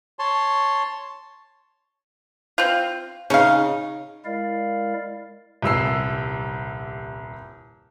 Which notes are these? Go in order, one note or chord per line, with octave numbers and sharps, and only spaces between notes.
C#5 A5 C6
C4 F4
C#3 C#4 D#4 F5
G#3 E4 A#4 D5 F5
D#1 C2 E6 C7